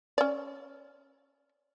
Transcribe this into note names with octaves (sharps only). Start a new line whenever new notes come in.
C#4 D5